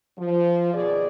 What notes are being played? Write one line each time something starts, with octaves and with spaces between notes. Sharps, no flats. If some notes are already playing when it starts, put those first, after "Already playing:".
F3
D#2 B2 G#4 D5